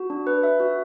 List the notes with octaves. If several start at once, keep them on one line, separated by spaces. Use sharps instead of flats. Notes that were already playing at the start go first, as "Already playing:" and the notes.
Already playing: F#4
D4
B4
E5
F#4